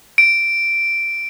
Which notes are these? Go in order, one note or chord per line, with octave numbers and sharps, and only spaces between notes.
D7